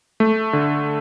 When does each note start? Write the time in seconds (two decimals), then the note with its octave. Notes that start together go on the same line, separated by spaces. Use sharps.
0.20 A3
0.53 D3